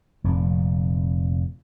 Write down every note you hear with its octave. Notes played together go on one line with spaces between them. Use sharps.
F1 F2 A#2